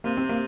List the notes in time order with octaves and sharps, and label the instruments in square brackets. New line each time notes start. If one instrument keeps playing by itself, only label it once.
[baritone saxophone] C3 [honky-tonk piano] A#3
[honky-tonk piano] C4
A#3